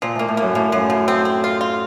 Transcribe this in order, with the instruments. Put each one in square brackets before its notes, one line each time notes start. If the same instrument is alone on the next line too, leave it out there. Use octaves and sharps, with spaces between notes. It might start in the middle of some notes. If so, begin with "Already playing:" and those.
[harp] A#2 [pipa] F3
[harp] A2 [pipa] A#3
[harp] A2
[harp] F#2 [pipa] A#3
[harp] A2 [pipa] A#3
[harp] F#2 [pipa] F3
[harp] A2 [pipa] F3
[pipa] C4
C4
F4
F4